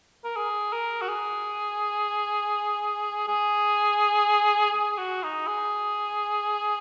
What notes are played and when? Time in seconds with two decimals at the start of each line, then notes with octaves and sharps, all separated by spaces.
0.24 A#4
0.36 G#4
0.72 A#4
1.02 F#4
1.09 G#4
3.28 G#4
4.74 G#4
4.98 F#4
5.23 D#4
5.47 G#4